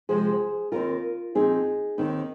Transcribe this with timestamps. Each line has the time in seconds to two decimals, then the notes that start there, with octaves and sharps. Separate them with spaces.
0.09 C3 F3 G#3 G#4 C5
0.72 D#2 D#3 C4 F4 A#4
1.35 A#2 F3 C4 D#4 G#4
1.98 D#2 D#3 C4 D#4